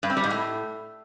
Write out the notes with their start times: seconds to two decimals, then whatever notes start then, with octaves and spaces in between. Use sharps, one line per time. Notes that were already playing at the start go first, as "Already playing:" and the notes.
0.03 G2
0.10 C4
0.17 G3
0.24 G#2
0.30 A2